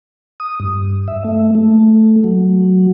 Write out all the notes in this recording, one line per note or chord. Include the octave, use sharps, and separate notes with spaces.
D#6
G2
E5
A3
A3
F#3